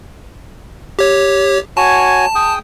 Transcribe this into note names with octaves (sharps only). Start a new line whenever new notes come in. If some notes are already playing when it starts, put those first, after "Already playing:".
G4 C#5
F#4 C#5 G#5 A5
G#4 G5 D#6